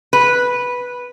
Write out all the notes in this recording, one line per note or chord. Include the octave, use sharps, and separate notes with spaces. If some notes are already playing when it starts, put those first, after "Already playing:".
B4